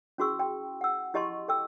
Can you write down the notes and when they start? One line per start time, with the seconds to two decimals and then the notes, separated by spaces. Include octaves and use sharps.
0.18 C#4 E4 F#4 G#4 C#6 E6
0.39 G5 C6
0.81 F#5 E6
1.14 E4 G4 D#5 A5 C6 C#6
1.48 A4 G5 E6